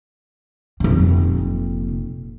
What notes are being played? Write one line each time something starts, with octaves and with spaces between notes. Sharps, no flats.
F1 A#2